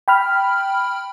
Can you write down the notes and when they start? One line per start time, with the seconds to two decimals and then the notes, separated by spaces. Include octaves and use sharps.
0.08 G5 B5 F6